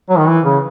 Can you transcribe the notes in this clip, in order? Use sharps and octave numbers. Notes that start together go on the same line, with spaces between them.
F#3
D#3
E3
C#3